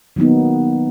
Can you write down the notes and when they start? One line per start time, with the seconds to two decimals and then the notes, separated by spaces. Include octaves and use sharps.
0.16 D#3 F#3 A#3 B3 D#4